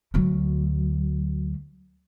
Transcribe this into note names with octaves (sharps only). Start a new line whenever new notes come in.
D2 F#3